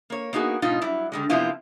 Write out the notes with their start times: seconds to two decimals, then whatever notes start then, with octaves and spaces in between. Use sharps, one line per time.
0.10 A#3 C#5
0.33 A#3 B3 D#4 F#4 G#4
0.62 G#2 B2 D#4 F4
0.82 F#3 G3 E4
1.12 D3 G3 G#3
1.29 F#2 C3 F3 B3 E4 F4